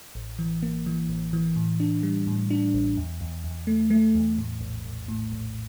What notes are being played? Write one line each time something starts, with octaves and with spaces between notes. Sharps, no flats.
A1
E3
A#3
E3
A1
E3
A2
D4
G3
A2
D4
A1
E2
E2
E2
A3
A3
E2
A2
A#1
A#1
A2
A#1